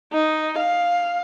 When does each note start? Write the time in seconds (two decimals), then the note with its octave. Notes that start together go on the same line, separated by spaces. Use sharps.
0.13 D#4
0.58 F5